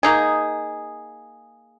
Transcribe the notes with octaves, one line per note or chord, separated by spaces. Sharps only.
A#3 D#4 G#4